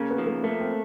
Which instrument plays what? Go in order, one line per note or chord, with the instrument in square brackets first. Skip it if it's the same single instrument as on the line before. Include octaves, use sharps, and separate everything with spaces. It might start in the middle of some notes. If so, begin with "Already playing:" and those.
Already playing: [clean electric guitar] C#3 [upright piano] A#3
[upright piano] B3
[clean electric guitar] F3
[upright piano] A#3
[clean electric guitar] A3 [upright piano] A#3
[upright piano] C4